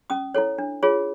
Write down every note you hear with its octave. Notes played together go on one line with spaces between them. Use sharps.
C#4 D#6
E4 A4 C#5
D4
F4 G#4 C#5